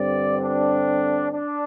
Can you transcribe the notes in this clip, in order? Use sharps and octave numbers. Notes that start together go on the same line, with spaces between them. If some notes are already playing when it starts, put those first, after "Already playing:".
Already playing: G2 D3 C4 D5
D4
D4